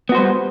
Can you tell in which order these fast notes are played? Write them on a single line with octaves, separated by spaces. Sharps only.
B3 F#4 C5 G3